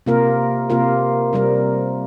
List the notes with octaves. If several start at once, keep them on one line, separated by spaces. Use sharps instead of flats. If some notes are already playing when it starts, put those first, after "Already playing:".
C3 A#3 F4 A#4
C3 A#3 F4 A#4
C3 G3 C4 A#4